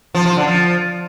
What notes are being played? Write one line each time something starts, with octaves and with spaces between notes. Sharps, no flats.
F3
F3
D3
F3